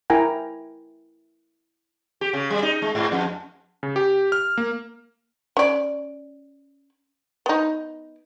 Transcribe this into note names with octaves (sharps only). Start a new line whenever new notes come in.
E4 A#4 G5 G#5 A#5
G4
C#3
G3
D#4
G#3
G#2
F2
C#3
G4
F6
A#3
C#4 D5
B3 D#4